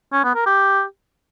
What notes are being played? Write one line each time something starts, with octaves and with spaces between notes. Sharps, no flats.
C#4
B3
A#4
G4